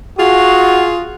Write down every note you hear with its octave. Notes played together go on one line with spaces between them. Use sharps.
F4 F#4 G#4